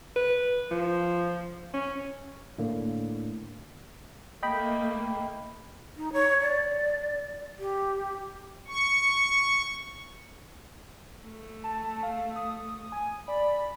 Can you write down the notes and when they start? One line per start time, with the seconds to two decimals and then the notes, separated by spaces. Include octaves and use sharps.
0.16 B4
0.71 F3
1.74 C#4
2.58 A2 D3 A#3
4.43 A3 A#3 D#5 G5 B5
5.97 D#4
6.13 C#5
6.41 D5
7.59 G4
8.68 C#6
11.24 A3
11.64 A5
12.03 F5
12.36 D#6
12.92 G#5
13.28 D5 B5